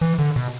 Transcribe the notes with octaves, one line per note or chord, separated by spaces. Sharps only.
E3
D3
B2